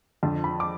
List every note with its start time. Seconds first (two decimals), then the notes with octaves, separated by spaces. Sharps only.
0.23 F2 D3 F3 A5
0.44 B5
0.60 D6